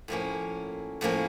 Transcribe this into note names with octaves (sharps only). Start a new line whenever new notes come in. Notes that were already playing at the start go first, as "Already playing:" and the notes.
A2 F3 A#3 C#4
A2 F3 A#3 C#4